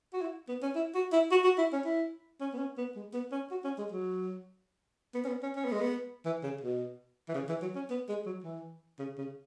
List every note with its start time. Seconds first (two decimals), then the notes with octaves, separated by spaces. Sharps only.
0.13 F#4
0.22 E4
0.49 B3
0.63 C#4
0.75 E4
0.95 F#4
1.12 E4
1.31 F#4
1.44 F#4
1.58 E4
1.73 C#4
1.85 E4
2.41 C#4
2.53 B3
2.58 C#4
2.78 B3
2.96 G#3
3.13 B3
3.32 C#4
3.51 F#4
3.64 C#4
3.78 G#3
3.92 F#3
5.15 B3
5.25 C#4
5.28 B3
5.43 C#4
5.56 C#4
5.65 B3
5.72 G#3
5.81 B3
6.25 E3
6.43 C#3
6.61 B2
7.29 E3
7.35 C#3
7.49 E3
7.62 F#3
7.75 C#4
7.90 B3
8.09 G#3
8.26 F#3
8.44 E3
8.99 C#3
9.18 C#3